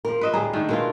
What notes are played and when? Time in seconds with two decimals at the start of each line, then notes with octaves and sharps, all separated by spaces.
0.05 F3 A#4
0.21 B4 D#5 E5
0.34 D2 A2 G3 G#4 A#5
0.53 D#3 A3 D4
0.69 B2 G#3 E4 F4 A#4